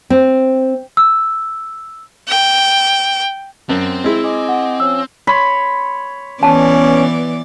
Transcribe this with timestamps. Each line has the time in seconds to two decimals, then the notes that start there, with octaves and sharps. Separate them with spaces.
0.10 C4
0.97 E6
2.29 G5
3.69 F#2 C4
4.04 G#3 E4
4.24 D#5 G#5 D6
4.49 F#5
4.80 F3 C#4 E6
5.27 C#5 B5 C6
6.43 E3 B3 C#4 D5 A5